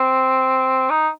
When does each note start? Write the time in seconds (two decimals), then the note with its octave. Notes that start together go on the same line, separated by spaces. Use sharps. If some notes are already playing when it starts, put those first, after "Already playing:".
Already playing: C4
0.90 D#4